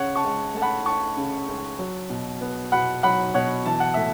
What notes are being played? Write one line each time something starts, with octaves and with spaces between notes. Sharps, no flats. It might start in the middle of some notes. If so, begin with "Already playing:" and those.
Already playing: C#3 C#5 F#5
A5 C#6
C#2
A3 A5
F#5 B5
C#4 A5 C#6
C#3
C#2
F#3
B2
B3
B2 F#5 B5
F#3 F#5 B5
B2 C#5 F#5
E3 A5
F#5
A2 E5